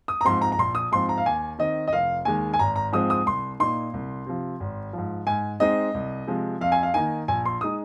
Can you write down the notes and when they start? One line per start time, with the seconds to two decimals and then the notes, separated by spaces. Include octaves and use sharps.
0.08 D#6
0.21 A#5
0.25 G#2 F3 C4 C6
0.42 A#5
0.52 A#5
0.58 A#1 C6
0.75 D#6
0.92 G#2 F3 C4 C6
1.09 A#5
1.18 F5
1.26 D#2 G#5
1.58 D#3 C4 D#5
1.87 D#5
1.93 F1 F5
2.25 D#2 D#3 G#3 G#5
2.54 G#5
2.59 G#1 A#5
2.76 A#5
2.92 G#2 F3 G#3 C4 D#6
3.10 D#6
3.26 C2 C6
3.60 A#2 A#3 D#4 C6
3.94 C2
4.26 C3 F3
4.60 G#1
4.93 G#2 F3
5.27 G#2 G#5
5.60 G#3 C4 D#4 D#5
5.94 C2
6.28 C3 F3 G#3
6.61 F2 F5
6.72 G#5
6.83 F5
6.94 D#3 A#3 D#4 G#5
7.28 A#1 G#5
7.45 C6
7.61 G#3 D#4 D#6